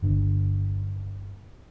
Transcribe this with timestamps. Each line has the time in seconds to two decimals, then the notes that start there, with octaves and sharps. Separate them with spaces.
0.02 G1 D3